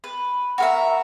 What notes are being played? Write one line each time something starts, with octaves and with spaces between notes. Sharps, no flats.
B4
F#4 A#4 E5